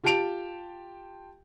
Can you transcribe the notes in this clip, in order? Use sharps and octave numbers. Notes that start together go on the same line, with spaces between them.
F4 G4 G5 A5 D7 F7